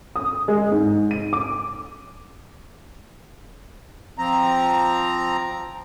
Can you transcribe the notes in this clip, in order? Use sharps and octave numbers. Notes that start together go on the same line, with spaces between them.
D#6
G#3
G#2
D#7
D6
F3 C4 A#5